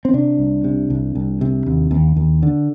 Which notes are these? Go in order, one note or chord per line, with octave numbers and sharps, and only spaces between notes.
C4
C3 D4
C2
C3
C2
C2
C3
D#2
D#2
D#2
D3